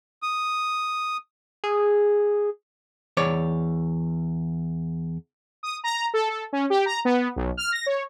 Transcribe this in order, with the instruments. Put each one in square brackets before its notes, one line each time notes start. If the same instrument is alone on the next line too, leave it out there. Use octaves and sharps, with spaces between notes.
[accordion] D#6
[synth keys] G#4
[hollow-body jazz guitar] E2 C#5 D5
[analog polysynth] D#6
A#5
A4
A4
C#4
G4
A#5
B3
B1
F6
A#6
C#5